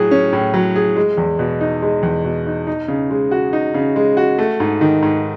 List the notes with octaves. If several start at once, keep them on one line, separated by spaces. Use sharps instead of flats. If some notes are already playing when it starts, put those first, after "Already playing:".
Already playing: A2 F#3 G#4
C#4
A2
F#3
G#4
G#3
E2
B2
D#4
G#3
E2
B2
D#4
D#4
C#3
G#3
F#4
D#4
C#3
G#3
F#4
A3
G#2
D#3
G#2